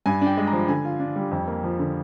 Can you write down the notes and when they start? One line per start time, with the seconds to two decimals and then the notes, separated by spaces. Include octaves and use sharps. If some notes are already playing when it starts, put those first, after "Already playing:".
0.06 G2 G#5
0.21 D4 G5
0.37 G#3
0.47 A#5
0.53 F3
0.68 D3 G#5
0.84 F4
1.00 D4
1.16 G3
1.31 F2
1.47 A#3
1.64 F3
1.79 D3